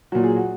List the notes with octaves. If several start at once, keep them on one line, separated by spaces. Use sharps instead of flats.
A#2 F#3 F#4
G#4
F#4